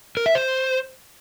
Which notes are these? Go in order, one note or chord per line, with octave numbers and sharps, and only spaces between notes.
A#4
E5
C5